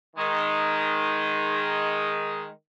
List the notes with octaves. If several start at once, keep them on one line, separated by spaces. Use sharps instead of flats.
D#3 G#3